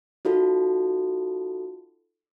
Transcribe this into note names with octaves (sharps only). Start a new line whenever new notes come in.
D#4 F4 F#4 A4